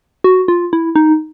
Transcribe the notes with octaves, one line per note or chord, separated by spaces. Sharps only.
F#4
F4
E4
D#4